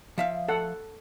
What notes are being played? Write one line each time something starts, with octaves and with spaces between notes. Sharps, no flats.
F3 E5 F5
A4 F#5